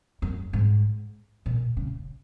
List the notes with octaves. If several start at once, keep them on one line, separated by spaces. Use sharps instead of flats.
F#2
G#2
A#2
C#3